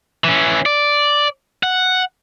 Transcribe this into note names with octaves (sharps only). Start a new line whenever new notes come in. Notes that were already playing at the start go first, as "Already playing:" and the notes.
E3 C#4
D5
F#5